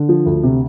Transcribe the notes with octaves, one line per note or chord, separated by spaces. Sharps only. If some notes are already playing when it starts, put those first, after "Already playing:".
Already playing: D3
F3
D2
C3